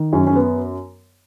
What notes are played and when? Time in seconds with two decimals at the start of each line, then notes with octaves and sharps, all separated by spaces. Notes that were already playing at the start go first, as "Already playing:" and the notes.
Already playing: D#3
0.13 F#2 C#4
0.27 C#4
0.35 B3